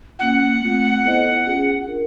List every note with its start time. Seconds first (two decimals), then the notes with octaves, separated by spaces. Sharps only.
0.19 A#3 C#4 F4 F#5
0.61 A3 C4 F4
1.04 B3 E4 A4 C5 D#5
1.45 C#4 F4 G#4
1.87 D4 F4 A#4